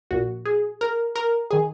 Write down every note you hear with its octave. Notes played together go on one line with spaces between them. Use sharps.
A#1 A#2 F#4
G#4
A#4
A#4
D#3 G#4